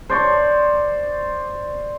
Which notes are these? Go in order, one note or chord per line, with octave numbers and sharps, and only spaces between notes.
C5 D5 C#6